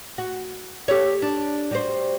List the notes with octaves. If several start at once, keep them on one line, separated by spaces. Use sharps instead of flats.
F#4
G4 A4 C#5
D4
G3 F#4 C5